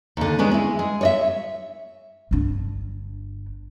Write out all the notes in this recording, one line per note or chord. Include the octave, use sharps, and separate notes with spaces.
D#2 D3
G#3 B3 C#4 D4
G#3 E4
G#3
C#5 D#5 E5
G1 D4